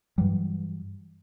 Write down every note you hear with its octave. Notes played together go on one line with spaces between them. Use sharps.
G2 E3 F#3 G3